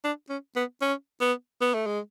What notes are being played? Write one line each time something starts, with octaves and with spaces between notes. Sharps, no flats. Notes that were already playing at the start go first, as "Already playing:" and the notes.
D4
C#4
B3
C#4
B3
B3
A3
G#3